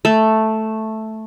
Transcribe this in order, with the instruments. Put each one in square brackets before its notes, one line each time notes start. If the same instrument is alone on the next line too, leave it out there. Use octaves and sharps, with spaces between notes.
[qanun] A3